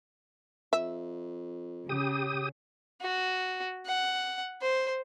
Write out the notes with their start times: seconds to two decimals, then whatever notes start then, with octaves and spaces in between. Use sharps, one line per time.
0.73 F2 E5
1.89 C#3 G4 D#6
3.01 F#4
3.86 F#5
4.61 C5